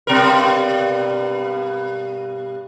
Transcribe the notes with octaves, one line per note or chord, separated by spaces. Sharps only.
G2 B2 A#4